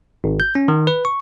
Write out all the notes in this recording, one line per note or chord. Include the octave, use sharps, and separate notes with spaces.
G#1
G6
C#4
D#3
B4
C#6